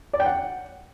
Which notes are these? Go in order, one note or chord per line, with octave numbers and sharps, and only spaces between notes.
D5
G5
F#5